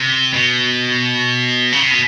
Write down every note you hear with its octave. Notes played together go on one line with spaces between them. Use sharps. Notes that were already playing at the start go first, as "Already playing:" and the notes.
Already playing: C3
B2
C#3
C3
B2